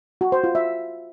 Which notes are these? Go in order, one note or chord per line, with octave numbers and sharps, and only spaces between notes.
F#4
C5
F4
E5